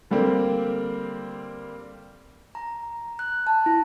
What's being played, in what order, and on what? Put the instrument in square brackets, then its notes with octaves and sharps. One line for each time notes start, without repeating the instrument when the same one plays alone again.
[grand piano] D3 G3 A#3 C4
[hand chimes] A#5
F#6
A5
E4